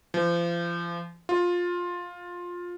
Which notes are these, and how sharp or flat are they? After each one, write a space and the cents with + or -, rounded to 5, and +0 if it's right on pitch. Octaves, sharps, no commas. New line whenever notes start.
F3 -35
F4 +15